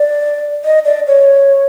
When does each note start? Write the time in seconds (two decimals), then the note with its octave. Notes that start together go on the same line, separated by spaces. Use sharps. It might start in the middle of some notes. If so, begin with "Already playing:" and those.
Already playing: D5
0.65 D#5
0.85 D5
1.07 C#5